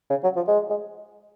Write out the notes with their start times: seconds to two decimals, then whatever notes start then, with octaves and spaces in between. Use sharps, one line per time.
0.10 C#3
0.24 F#3
0.36 F3
0.48 G#3
0.70 G#3